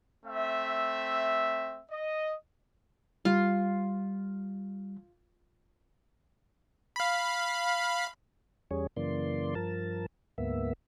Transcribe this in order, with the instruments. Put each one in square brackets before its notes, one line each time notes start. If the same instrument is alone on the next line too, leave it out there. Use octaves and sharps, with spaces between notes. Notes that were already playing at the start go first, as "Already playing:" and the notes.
[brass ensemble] A3 C4 E5
D#5
[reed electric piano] G3 [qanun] F4
[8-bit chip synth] F5 B5
[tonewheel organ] E2 G3 C#4 G#4 C#5
F#2 C#3 E3 A#3 D5 C6
G2 F3 A#4 A5
D2 G#2 A#3 B3 E5